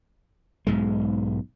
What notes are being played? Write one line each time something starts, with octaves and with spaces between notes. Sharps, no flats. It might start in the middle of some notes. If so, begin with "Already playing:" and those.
B1 G#2 G#3